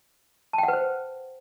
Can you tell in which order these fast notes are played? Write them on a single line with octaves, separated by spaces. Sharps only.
A5 G5 F#5 B4 C5